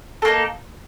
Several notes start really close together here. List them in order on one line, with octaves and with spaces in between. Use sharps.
A4 A#3 D#4